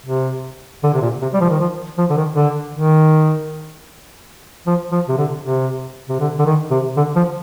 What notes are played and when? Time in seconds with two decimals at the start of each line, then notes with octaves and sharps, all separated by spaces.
0.06 C3
0.84 D3
0.94 C3
1.02 A#2
1.22 C3
1.34 G3
1.41 F3
1.50 D#3
1.60 F3
1.98 F3
2.10 D3
2.17 D#3
2.36 D3
2.75 D#3
4.67 F3
4.92 F3
5.09 C3
5.18 D3
5.44 C3
6.09 C3
6.20 D3
6.39 D3
6.46 D#3
6.71 C3
6.97 D3
7.16 F3